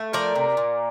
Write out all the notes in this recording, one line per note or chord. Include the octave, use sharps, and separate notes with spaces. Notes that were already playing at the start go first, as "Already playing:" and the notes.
Already playing: A3
F3 A#4 D5
C3
A#2